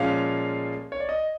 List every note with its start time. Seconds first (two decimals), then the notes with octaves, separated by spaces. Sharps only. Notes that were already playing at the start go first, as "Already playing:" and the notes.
Already playing: A#2 F3 G#3 C#4 F5
0.92 C#5
1.00 D5
1.09 D#5